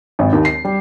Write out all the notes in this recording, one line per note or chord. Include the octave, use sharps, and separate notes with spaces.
G#1
D#2
C7
G3